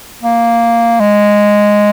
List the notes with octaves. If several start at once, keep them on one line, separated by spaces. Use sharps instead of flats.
A#3
G#3